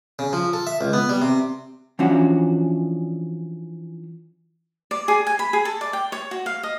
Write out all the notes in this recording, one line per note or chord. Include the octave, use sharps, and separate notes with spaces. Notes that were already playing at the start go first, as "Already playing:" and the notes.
C#3
F3
A4
E5
C#2
B3
G3
C3
E3 F3 C#4 D4 F#4
D5
G#4
G#5
B5
G#4
A4
D5
G5
C#5
F#4
F5
D#5